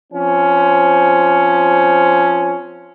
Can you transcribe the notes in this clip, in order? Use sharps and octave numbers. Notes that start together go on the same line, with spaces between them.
F3 C4 C#4